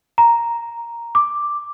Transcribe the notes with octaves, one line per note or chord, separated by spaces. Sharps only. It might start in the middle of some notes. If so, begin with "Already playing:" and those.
A#5
D6